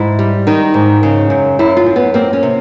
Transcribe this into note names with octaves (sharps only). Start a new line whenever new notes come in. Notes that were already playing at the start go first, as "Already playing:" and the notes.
Already playing: G#2 E4
G3
D#3 D#4
G#2
C#3
F#2
F#2 E4
F4
F#2
B3
A#3 C4
C#4
C3